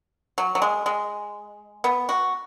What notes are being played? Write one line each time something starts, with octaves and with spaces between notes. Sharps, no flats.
F#3
F#3
G#3
G#3
B3
F#4